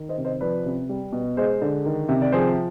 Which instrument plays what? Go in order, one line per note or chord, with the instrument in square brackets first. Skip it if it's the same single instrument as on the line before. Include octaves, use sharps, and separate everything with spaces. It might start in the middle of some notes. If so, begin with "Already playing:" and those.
Already playing: [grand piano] D#3
C5 D#5
C3
C5 D#5
F3 B4 D5
C3
G3
B2
G#3 C5 D#5
D3
D#3
C3
D5
F3 G#4 C5